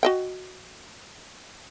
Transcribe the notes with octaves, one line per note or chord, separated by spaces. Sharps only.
F#4 D#5 G5